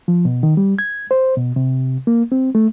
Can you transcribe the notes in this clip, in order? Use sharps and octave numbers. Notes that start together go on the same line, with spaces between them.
F3
B2
D#3
G3
G#6
C5
B2
C3
A#3
C4
A3